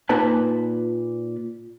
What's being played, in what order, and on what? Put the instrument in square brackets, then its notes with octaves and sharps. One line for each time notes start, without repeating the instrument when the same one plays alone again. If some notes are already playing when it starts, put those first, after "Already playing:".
[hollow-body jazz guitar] A#2 D#4 B4 A5